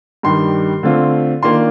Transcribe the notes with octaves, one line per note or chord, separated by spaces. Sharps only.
G2 D#3 G3 C6
D3 A3 C4 F4
D#3 A#3 D4 F4 C6